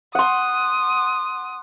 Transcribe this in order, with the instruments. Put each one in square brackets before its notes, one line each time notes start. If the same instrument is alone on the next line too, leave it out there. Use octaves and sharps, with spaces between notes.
[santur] F#5 C6 [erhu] D#6